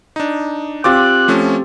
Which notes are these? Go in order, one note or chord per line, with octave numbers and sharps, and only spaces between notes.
D4 D#4
C4 F4 G4 D6 F#6 A6
F3 A3 C#4